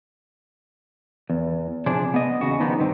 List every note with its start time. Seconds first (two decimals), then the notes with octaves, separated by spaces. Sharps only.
1.30 E2
1.86 C3 F3 D4 G#4
2.14 B3 D#5
2.41 E2 C#3 F#4
2.60 D#3 F3 B3 D4 D#4
2.80 G2 D#3 C4